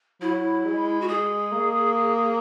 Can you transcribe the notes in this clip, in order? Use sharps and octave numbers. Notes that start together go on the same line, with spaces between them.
F#3 E4
G#3
F#4
G#3 G#4
A#3